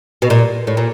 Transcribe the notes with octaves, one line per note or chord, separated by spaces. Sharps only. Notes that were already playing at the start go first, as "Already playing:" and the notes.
B2
A#2
A2
A#2